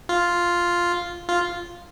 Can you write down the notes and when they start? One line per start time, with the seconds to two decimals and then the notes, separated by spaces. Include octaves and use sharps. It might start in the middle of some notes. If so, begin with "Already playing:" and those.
0.09 F4
1.29 F4